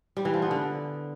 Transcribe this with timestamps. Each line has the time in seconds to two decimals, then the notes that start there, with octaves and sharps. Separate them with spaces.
0.17 G3
0.25 E3
0.34 F3
0.42 B3
0.51 D3